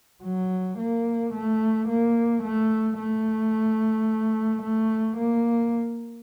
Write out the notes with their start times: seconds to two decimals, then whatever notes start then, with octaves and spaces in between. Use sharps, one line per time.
0.23 F#3
0.78 A#3
1.33 A3
1.88 A#3
2.43 A3
2.98 A3
4.62 A3
5.17 A#3